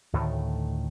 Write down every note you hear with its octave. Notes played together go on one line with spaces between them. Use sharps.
D2 A2 D#3 A3